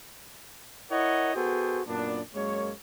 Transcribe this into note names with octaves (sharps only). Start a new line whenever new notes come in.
E4 A#4 C#5 D#5 F#5
B3 F#4 G#4 A4 C5 G5
F#2 A#2 B3 D4
F#2 G#3 A#3 C#5